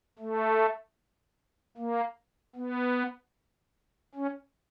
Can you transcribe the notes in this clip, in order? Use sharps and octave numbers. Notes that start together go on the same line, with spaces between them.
A3
A#3
B3
C#4